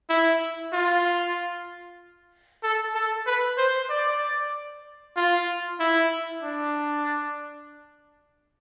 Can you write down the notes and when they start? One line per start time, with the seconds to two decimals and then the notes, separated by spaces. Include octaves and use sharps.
0.09 E4
0.73 F4
2.63 A4
2.94 A4
3.26 B4
3.58 C5
3.89 D5
5.16 F4
5.79 E4
6.43 D4